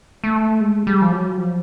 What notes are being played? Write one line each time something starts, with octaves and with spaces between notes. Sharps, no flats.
A3
G#3
G3
F3
F#3
F3